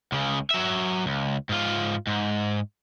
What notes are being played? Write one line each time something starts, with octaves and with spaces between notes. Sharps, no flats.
C#2 C#3
F#3 E5
C#2
G#2 F4
G#2